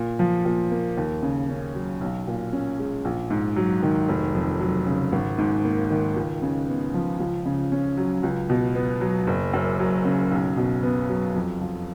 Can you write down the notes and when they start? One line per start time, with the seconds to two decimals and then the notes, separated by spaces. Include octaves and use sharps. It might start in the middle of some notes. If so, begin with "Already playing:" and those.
Already playing: A#2
0.19 F3
0.45 A#2
0.71 A#3
0.97 D#2
1.23 C#3
1.49 C#4
1.75 F#3
2.01 B1
2.27 A#2
2.53 C#4
2.79 G#3
3.05 A#1
3.30 G#2
3.56 F#3
3.83 D#3
4.09 F1
4.34 F2
4.60 F#3
4.86 C#3
5.12 G#1
5.38 G#2
5.64 A#3
5.90 D#3
6.16 C#2
6.42 C#3
6.68 B3
6.94 F3
7.20 C#2
7.46 C#3
7.72 C#4
7.97 F#3
8.23 C#2
8.50 B2
8.75 B3
9.01 F#3
9.27 F#1
9.53 F#2
9.79 F#3
10.05 C#3
10.31 B1
10.57 B2
10.83 B3
11.09 F#3
11.35 F2
11.61 F3